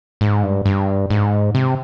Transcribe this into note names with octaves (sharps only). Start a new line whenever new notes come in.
G#2
G2
G2
G#2
C3